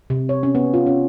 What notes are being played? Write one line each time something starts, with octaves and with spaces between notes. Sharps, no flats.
C3
C#5
C#4
B3
F4
C#4